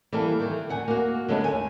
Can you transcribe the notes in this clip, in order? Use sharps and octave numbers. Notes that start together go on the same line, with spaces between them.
E3 G3 A#3 A4 A#4
D#3 E3
D2 F#5 G#5
A#3 F#4
D3 F#3 G#3 A3 B3 C#4
D#2 G#5